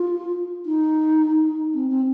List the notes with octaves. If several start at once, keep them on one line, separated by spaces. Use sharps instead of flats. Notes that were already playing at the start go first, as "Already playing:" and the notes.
Already playing: F4
D#4
C4
C4